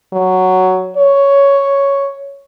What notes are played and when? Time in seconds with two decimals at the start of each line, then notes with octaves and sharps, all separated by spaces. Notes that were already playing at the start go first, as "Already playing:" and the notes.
0.13 F#3
0.97 C#5